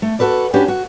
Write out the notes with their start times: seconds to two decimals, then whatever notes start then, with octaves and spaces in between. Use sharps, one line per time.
0.02 A3
0.19 F#4 A4 B4 D5
0.53 C#4 D4 F#4 G4 B4
0.68 F#4